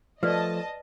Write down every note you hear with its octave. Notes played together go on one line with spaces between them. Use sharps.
F3 A3 B4 D5 D#5 A5